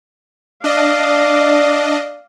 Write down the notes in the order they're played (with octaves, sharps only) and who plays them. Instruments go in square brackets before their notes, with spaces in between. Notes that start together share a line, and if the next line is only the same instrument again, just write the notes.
[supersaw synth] D4 D#5 [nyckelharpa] D5 F5